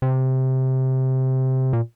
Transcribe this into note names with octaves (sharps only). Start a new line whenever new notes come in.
C3
A#2